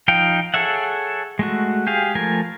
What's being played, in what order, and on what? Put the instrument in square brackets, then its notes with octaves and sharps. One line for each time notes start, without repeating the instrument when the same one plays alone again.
[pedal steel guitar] F3 D#4 F5 G5
G#4 A4 C#5 E5 F#5
G#3 A3 F#4
G4 G#4 F5
F3 A3 A#4 G#5